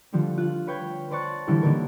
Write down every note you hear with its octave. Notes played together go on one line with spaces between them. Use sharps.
D3 F3 G3 A3 D4
F4 F#6
B4 C#5 G5 B5 G6 G#6
B4 C5 D5 A5 C#6 F#6
D3 E3 G3 C#4 E4 A4
D3 A#3 D#4 A#4 B4